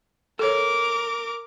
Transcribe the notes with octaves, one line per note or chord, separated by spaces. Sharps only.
A4 A#4 C#5 D6